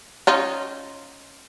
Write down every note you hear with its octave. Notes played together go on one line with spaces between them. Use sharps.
C#4 D#4 F4